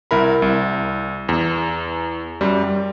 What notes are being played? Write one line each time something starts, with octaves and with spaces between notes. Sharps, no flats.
C2 E4 A#4 B5
C2
E2
F#2 G3
G3